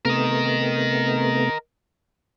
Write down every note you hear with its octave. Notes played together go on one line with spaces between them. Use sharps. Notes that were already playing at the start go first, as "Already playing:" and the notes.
C3 A3 B3 A#4 D#5